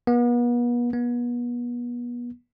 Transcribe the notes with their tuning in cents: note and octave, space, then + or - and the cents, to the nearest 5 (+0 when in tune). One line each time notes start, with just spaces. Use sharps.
B3 -40
B3 -35